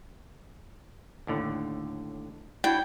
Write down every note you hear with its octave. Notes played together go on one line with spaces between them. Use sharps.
D#2 A2 D3
D4 E4 F#4 G5